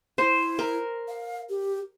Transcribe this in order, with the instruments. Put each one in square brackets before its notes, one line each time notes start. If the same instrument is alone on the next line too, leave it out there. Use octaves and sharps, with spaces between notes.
[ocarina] E4 [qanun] C5
[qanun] A#4
[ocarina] F5
G4